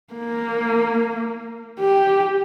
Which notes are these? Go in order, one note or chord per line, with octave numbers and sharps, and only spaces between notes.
A#3
G4